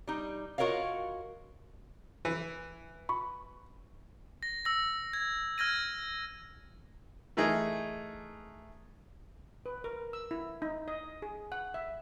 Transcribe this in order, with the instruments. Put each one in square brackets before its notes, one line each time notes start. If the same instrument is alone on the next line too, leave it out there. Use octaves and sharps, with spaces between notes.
[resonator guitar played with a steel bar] G3 D#4
F4 F#4 A#4 C#5 D#5 F5
[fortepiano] E3
[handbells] B5 C#6
[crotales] A#6
E6 A#6
G#6
F6 G#6 A#6 D#7
[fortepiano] E3 A3 D#4 G#4 A#4
[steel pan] B4
A#4
E6
E4
D#4
D#5
G#4
F#5
E5